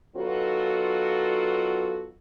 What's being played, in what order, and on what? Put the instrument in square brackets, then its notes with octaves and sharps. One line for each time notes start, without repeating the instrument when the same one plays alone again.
[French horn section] D#3 F#3 B3 F4 F#4 A4